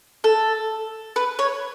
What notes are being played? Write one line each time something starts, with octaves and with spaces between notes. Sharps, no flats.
A4
B4
C#5